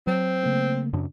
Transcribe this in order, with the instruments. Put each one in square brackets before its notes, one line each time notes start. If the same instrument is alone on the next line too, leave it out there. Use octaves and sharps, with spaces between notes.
[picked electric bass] F#3 [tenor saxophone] C4
[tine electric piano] C#3 A3 A#3
[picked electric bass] F#2 C#3 D4